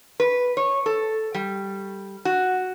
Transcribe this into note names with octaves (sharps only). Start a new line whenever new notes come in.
B4
C#5
A4
G3
F#4